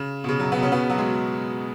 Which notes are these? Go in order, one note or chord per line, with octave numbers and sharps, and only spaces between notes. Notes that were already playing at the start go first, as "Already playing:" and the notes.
Already playing: C#3
B2
C#3
F#2 F#3
B2 B3
C#3 C#4
B2 B3
F#3 F#4
G#3 G#4